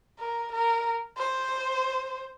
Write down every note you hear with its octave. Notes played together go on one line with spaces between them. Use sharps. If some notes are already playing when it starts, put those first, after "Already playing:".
A#4
A#4
C5